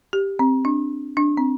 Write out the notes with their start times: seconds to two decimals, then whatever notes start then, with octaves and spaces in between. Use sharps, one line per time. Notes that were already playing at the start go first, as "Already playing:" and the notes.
0.13 G4
0.39 C4
0.65 D4
1.17 D4
1.37 C4